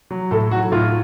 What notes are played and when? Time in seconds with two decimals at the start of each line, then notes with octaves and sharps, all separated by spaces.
0.11 F#3
0.31 A2 A4
0.51 F#3 F#4
0.72 A2 F4